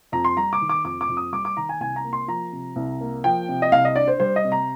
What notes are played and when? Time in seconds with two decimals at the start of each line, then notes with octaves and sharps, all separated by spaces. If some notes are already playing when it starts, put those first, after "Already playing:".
0.12 F2 A#5
0.25 C6
0.36 G3 A#5
0.53 D6
0.61 D#3
0.69 D6
0.84 F2 D6
1.01 D6
1.09 F2
1.17 D#6
1.32 G3 D6
1.45 D6
1.57 D#3 A#5
1.69 G#5
1.80 C2 G#5
1.96 A#5
2.04 A#3
2.13 C6
2.28 F3 A#5
2.52 C3
2.76 C2
3.01 A#3
3.24 F3 G5
3.49 C3
3.62 D#5
3.72 C2 F5
3.85 D#5
3.96 D4 D5
4.08 C5
4.20 G3 C5
4.36 D#5
4.44 C3
4.52 A#5